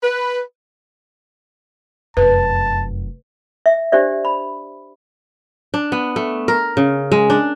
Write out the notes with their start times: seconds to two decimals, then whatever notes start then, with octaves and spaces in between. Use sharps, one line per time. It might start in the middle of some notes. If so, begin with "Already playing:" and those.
0.03 B4
2.17 F1 F#2 B4 A5
3.66 E5
3.92 D4 G4 C5 D5 E5
4.25 B5
5.74 D4
5.92 B3
6.16 A3
6.48 A#4
6.77 C#3
7.12 G#3
7.30 D4